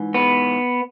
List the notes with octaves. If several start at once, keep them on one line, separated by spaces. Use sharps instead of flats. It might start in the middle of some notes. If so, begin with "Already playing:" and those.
Already playing: G#2 E3
B3